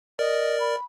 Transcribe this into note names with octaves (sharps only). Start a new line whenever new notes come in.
A#4 D5 D#5
B5